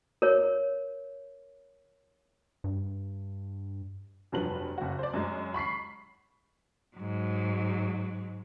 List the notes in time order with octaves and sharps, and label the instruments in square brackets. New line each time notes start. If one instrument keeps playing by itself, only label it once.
[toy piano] A#4 C#5
[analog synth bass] G2
[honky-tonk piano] F1 G2 F3 F#3 B4 F#7
F#1 F#4
C5 D5
F#2 G#3
B5 C#6 B6 C7
[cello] G#2 F#3